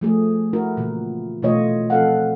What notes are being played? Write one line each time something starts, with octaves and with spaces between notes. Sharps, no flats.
F3 A3 G#4
E4 F#4 A#4
A#2 C#3 E3
B2 E3 A3 F4 C#5 D#5
F3 C4 A4 F5 F#5